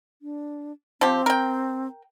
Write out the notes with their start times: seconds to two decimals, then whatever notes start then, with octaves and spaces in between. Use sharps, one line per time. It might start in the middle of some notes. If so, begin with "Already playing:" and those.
0.22 D4
1.01 F3 C4 G4
1.26 A#4 G5